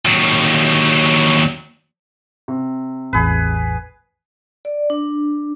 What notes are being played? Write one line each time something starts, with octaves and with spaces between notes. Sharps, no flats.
D#2 F#3
C3
A1 E2 G#4 B4
D5
D4